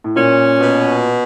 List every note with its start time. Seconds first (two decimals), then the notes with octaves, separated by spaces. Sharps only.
0.04 A2
0.16 A#2 C#4
0.59 B2